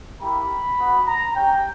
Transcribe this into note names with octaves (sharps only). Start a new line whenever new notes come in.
A#3 E4 G4 B5
B3 F#4
A#5
C#4 G4 G5